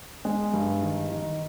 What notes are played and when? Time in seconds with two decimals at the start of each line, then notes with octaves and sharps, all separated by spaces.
0.25 G#3
0.53 G2
0.83 D#3
1.11 D#3